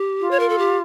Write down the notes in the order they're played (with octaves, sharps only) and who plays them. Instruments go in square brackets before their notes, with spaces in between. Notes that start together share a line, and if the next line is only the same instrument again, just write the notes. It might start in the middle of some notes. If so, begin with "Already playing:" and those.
Already playing: [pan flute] G4
[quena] F4
[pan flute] C#5
A#4
A4
G4